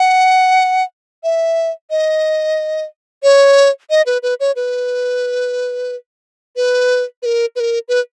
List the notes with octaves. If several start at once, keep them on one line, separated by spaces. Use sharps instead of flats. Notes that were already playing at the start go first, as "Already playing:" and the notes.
Already playing: F#5
E5
D#5
C#5
D#5
B4
B4
C#5
B4
B4
B4
A#4
B4
A#4
B4